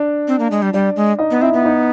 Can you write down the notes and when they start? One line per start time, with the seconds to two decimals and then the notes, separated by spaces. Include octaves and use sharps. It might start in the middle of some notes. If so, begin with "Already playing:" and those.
Already playing: D4 D5
0.28 C4
0.39 A#3
0.51 G#3
0.62 G3
0.73 G3 D4 D5
0.96 G#3
1.19 D#4 D#5
1.31 B3
1.42 C4 E4 E5
1.54 B3
1.65 D#4 D#5